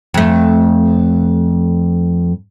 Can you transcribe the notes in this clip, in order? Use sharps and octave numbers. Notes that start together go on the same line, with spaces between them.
F2 A3